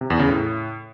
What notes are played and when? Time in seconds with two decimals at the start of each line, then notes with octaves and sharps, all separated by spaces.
0.01 C3
0.10 E2
0.19 C#3
0.29 A2